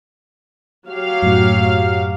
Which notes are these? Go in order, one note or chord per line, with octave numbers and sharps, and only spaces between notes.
F#3 G4 F5
F#2 A2